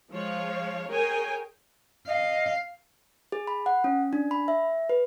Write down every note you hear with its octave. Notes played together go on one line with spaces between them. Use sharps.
F3 G#3 C#5 F5
G#4 A#4 C#5 G5 G#5
D#5 F5
G#4
B5
F#5
C#4
D4
B5
E5
B4